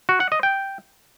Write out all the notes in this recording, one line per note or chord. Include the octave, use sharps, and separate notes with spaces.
F#4
F#5
D#5
G5